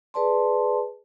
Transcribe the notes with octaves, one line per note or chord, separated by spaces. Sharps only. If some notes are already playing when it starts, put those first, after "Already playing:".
G#4 B4 D5 A5 C6